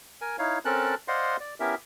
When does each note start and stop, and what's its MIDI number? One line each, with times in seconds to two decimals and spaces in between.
0.21 0.36 70
0.21 0.36 80
0.39 0.58 63
0.39 0.58 64
0.39 0.58 73
0.39 0.58 77
0.65 0.95 60
0.65 0.95 61
0.65 0.95 69
0.65 0.95 70
0.65 0.95 81
0.65 0.95 90
1.08 1.37 72
1.08 1.37 74
1.08 1.37 75
1.08 1.37 77
1.08 1.37 78
1.08 1.37 84
1.40 1.54 74
1.60 1.75 59
1.60 1.75 61
1.60 1.75 64
1.60 1.75 67
1.60 1.75 70
1.60 1.75 76